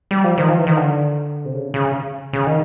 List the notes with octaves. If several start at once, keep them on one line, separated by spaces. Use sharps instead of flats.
G3
F3
D#3
F3
E3
D#3
D3
C3
C#3
C#3
C#3
D#3